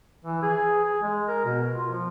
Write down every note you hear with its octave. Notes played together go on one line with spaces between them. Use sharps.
E3
G#4
G#4
G#3
A#4
B2
F4
F3